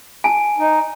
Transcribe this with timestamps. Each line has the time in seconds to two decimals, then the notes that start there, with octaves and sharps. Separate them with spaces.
0.24 G#5 A5
0.58 D#4